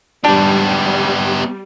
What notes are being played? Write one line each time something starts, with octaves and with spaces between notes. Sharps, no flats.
G3 B3 D4 G4